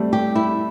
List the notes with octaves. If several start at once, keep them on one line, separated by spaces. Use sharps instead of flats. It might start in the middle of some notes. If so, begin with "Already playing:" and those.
Already playing: G3 A3 C4
G4
E4